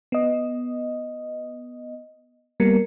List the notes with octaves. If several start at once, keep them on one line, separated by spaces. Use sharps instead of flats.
B3 D#5
G3 A#3 B3 A#4 C#7